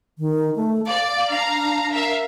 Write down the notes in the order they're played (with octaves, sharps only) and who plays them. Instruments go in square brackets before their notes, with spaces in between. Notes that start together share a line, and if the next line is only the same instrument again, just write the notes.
[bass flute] D#3
A3
[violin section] D5 [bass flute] F5
[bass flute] D4 [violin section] F5 A#5
[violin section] A#4 E5 F5